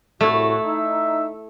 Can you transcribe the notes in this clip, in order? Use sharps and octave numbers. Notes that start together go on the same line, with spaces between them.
C2 A2 A3 E4 F#4
D#4 E5